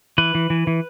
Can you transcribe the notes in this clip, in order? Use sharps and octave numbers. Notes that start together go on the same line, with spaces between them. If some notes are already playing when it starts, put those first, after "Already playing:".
E3 B4
E3
E3
E3